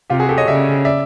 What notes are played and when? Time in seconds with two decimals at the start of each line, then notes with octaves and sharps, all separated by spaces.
0.10 C3 F4 G4
0.20 F#4 G#4
0.29 G4 A4
0.38 C#5 D#5
0.48 C#3 D5 E5
0.85 D5 E5